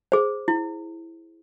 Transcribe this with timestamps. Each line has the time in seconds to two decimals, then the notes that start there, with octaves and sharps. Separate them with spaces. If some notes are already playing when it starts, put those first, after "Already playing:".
0.12 G#4 C5
0.48 E4